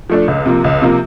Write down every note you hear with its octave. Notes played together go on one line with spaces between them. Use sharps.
F3 A3 D4
C#2
C3 F3 A#3
C#2
C3 F3 A#3